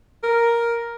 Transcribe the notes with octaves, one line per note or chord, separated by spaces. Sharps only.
A#4